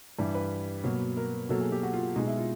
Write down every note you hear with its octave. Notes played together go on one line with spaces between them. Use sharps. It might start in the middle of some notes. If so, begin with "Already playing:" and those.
G2 E3 G3
B4
B2 F#3 A#3
A#4
B2 F#3 A#3 A4
G#4
G4
F#4
F4
B2 G#3 D#4
E4
F4